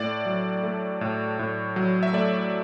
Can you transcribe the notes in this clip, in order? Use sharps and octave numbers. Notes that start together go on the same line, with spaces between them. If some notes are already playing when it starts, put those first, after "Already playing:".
Already playing: A2 D5
F#3
A3
A2
A2
F#3
E5
A3 D5